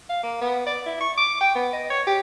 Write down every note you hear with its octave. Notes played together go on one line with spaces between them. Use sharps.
F5
A#3
B3
D5
E4
C#6
D6
G5
B3
D#5
C#5
G4